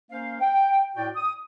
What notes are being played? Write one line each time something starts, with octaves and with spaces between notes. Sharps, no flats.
A#3 C#4 C5 F5
G5
A2 F#4 D5 G5
D#6